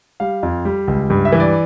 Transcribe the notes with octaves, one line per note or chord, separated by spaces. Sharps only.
G3 F5
F2
G3
C#2
G2
E5
E3
D5